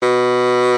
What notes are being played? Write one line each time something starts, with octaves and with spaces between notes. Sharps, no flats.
B2